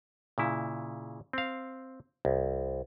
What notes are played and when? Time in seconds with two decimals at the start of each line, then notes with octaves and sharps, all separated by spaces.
0.38 A#2 C#3 E4
1.33 C4 F5
2.25 C2